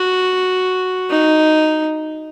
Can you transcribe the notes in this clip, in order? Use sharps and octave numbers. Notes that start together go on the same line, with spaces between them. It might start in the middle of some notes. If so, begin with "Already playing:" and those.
Already playing: F#4
D#4